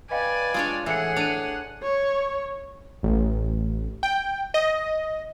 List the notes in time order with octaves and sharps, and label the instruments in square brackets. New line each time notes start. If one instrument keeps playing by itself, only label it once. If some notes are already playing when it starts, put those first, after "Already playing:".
[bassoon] B4 [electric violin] D5 G#5 [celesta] D#5 F5 G5
[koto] G#3 D4 C#5 [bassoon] F4
[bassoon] A2 [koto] E3 [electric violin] G#4 F#5 [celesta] E5 C#7
[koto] D4 [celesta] D#7 F7
[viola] C#5
[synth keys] A1
G5
D#5